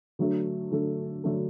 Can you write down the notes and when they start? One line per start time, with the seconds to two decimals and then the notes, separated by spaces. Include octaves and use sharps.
0.19 D3 F#3 A3 D4 A4
0.72 D3 F#3 A3 D4 A4
1.24 D3 F#3 A3 D4 A4